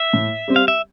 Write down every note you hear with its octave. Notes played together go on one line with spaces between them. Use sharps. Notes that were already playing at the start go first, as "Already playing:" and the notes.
Already playing: E5
A2
G3 C4
F5
E5